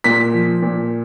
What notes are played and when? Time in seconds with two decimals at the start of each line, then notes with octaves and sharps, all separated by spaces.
0.04 A#2 B6
0.34 F3
0.62 A#2